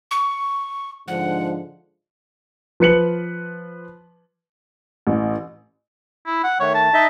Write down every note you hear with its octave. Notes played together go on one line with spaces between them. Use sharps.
C#6
G#2 D3 F3 F#5
F3 B4 C#7 F#7
A1
E4
F#5
D#3 A3 C#5
A5
D#4 D#5 E5